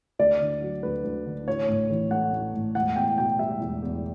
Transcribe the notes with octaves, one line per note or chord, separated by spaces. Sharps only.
D2 D5
D3
F#3
D2 B4
D2
D3
A1 C#5
A2
E3
A3 F#5
A1
A2
E1 F#5
E2 G5
B2 G5
G3 E5
E1
E2